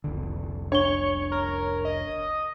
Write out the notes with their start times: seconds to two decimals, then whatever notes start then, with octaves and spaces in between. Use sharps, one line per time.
0.04 F1 C2 D3
0.72 D4 C#5 C#6 G7
1.32 A#4
1.85 D#5